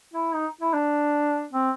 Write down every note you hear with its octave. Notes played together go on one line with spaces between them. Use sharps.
E4
D#4
E4
D4
C4